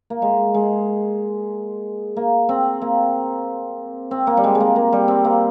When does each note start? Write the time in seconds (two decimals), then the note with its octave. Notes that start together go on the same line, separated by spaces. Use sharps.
0.10 A#3
0.22 G#3
0.54 G#3
2.17 A#3
2.49 C4
2.82 A#3
4.11 C4
4.27 A#3
4.37 G3
4.44 G#3
4.55 G#3
4.60 A#3
4.76 A#3
4.92 G3
5.08 C4
5.25 A#3